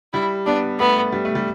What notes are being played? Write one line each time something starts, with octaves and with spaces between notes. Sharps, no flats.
G3 E4
B3 D4
A3 B3
G3
A3
G3